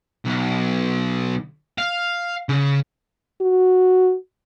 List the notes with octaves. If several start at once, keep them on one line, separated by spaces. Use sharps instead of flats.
B1
F5
C#3
F#4